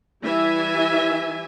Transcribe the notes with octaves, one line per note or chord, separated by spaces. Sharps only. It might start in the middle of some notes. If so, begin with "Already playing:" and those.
E3 G3 E5 G#5